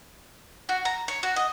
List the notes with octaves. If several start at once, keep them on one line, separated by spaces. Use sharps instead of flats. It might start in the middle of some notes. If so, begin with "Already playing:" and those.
F#4
A#5
C#5
F#4
D#5